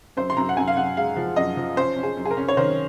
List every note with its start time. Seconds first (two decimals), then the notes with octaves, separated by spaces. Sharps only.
0.17 F#2 C5
0.30 C6
0.37 F#2 A#5
0.49 F#5
0.57 F#2 G#5
0.68 F5
0.77 F#2 F#5
0.97 G#3 F5
1.16 F3
1.36 F#2 D#5
1.57 F3
1.76 C#4 C5
1.96 C#4
2.03 G#4
2.17 F#2
2.25 G#4
2.31 A#4
2.37 C#4
2.48 C#5
2.57 D#3 C5